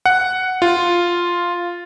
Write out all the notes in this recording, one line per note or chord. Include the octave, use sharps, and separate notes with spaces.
F#5
F4